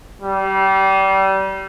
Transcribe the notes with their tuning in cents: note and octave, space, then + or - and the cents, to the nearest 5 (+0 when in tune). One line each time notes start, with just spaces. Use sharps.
G3 -25